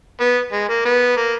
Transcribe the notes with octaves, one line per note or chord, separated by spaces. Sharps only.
B3
G#3
A#3
B3
A#3